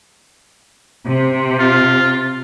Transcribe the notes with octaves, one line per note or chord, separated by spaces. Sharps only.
C3
F4